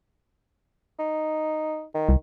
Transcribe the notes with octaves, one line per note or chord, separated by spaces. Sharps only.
D#4
D#3
C2